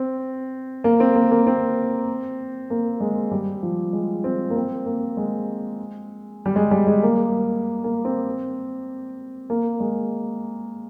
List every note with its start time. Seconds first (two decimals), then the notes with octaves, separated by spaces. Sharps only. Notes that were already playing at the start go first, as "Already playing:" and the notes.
Already playing: C4
0.84 A#3
1.00 C4
1.15 A#3
1.31 A#3
1.47 C4
2.70 A#3
3.00 G#3
3.32 G3
3.63 F3
3.93 G#3
4.24 C4
4.50 A#3
4.56 C4
4.86 A#3
5.17 G#3
6.46 G3
6.56 G#3
6.71 G3
6.87 G#3
7.03 A#3
7.84 A#3
8.05 C4
9.50 A#3
9.80 G#3